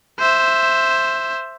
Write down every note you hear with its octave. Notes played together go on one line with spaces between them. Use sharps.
C5 E5